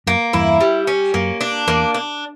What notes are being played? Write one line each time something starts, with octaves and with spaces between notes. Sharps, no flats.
F#2 A#3
E2 G2 E4
G3
C#4
F#2 A#3
D4
E2 A#3
D4